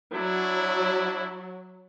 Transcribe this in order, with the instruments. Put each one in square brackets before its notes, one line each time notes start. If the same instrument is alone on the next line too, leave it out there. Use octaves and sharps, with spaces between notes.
[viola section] F#3 [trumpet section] D4 E4